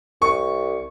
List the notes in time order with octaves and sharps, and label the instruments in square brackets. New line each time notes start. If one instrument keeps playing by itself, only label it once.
[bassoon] C2 [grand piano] C#6